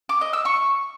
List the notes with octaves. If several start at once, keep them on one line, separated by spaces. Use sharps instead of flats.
D6
D#5
E6
C#6